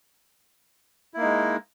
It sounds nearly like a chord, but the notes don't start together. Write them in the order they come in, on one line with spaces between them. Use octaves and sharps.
E4 A#3 D#4 G#3